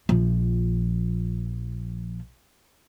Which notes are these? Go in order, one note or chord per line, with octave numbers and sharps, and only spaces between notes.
A#1 F3